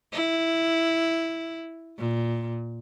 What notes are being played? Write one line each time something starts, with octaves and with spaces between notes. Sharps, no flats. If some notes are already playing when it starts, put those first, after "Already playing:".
E4
A#2